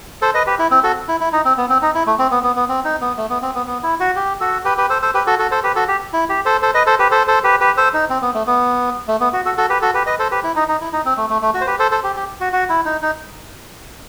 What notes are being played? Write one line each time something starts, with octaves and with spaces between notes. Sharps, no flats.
A4 C5
B4 D#5
G4 B4
E4
C4
F#4 A4
E4
E4
D#4
C4
B3
C4
D#4
E4
A3
C4
B3
B3
B3
C4
D#4
B3
A3
B3
C4
B3
B3
E4
F#4
G4
F#4 A4
G4 B4
G4 B4
A4 C5
A4 C5
G4 B4
F#4 A4
F#4 A4
A4 C5
G4 B4
F#4 A4
G4
E4
G4
A4 C5
A4 C5
B4 D#5
A4 C5
G4 B4
A4 C5
A4 C5
G4 B4
G4 B4
A4 C5
D#4
C4
B3
A3
B3
A3
B3
F#4
F#4 A4
F#4 A4
G4 B4
F#4 A4
G4 B4
B4 D#5
A4 C5
G4 B4
E4
D#4
D#4
E4
D#4
C4
A3
A3
A3
F#4
C5
G4 B4
A4 C5
A4 C5
G4
G4
F#4
F#4
E4
D#4
D#4